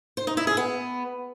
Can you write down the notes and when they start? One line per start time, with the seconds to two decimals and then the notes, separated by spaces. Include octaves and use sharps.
0.17 C5
0.27 D#4
0.37 E4
0.47 G#4
0.57 B3